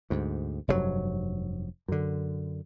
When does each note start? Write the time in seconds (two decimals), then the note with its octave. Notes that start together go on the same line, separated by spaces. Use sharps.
0.10 D2 G#2
0.68 F1 G2 A#2 F#3
1.88 F#2 D3